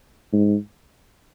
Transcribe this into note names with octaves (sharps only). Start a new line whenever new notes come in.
G#2